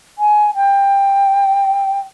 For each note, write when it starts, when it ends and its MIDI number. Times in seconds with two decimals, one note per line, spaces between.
0.18 0.50 80
0.55 1.99 79